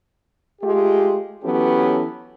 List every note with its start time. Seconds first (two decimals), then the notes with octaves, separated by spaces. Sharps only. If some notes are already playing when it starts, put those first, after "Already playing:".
0.62 G#3 A3 F4 G4
1.43 E3 F#3 B3 C#4 G4 A4